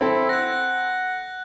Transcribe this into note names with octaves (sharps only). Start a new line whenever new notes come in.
C4 E4 A4
F#5 F#6 A#6